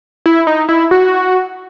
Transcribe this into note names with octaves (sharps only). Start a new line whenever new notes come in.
E4
D#4
E4
F#4